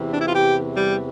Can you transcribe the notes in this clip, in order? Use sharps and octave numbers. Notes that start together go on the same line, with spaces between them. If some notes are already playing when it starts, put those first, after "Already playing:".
Already playing: E2 C3 E3
D4
E4
F4
G4
G3